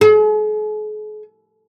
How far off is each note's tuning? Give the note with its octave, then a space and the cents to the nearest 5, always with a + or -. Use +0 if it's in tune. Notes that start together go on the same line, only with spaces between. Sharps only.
G#4 +45